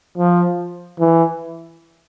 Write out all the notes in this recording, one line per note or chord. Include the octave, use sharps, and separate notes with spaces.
F3
E3